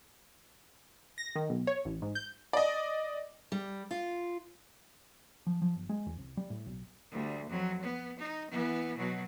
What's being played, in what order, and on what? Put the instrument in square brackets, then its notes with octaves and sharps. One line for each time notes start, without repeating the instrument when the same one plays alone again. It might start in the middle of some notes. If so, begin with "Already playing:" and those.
[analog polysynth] A#6
D#3
B1
C#5
A1
G#2
G6
[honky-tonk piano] D5 D#5
[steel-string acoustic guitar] G3
F4
[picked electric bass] F3
F3
G1
G#3
E2
C2
G3
A2
B1
[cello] D2 G3
F2 F#3
B3
D#4
E3 B3
B2 F#3